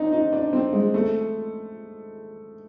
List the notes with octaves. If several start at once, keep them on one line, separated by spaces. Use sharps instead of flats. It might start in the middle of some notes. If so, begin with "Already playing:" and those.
Already playing: C4 D4 D#4
D#4
D4
C4
G#3
A3